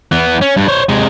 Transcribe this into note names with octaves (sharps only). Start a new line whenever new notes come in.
E3 B3
C#4
G2
C5 C#5
C3 G#3